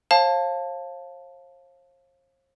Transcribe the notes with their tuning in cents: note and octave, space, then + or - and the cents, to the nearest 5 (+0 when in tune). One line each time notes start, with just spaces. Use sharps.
C5 +45 F5 +0 A5 +0